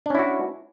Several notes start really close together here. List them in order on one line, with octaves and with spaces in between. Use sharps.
D4 C#4 E4 F#4